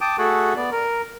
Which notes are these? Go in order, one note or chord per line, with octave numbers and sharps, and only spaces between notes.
G5 A5 D6 D#6
A3 F#4 G#4 A4 F#5
B3 D5
A#4